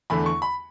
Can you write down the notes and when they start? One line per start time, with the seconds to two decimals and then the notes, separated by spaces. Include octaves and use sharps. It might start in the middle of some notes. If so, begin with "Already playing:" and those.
0.10 E2 D3 A3 B5
0.26 C#6
0.42 B5